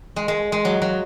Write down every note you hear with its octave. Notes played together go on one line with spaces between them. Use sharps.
G#3
G#3
G#3
F#3
F#3